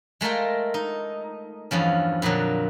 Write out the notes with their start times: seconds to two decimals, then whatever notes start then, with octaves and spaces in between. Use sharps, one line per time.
0.21 G#3 A3 F4 A#4 G5
0.74 D#4
1.71 E2 G2 F3 C#4
2.22 F2 A#2 D3 F#3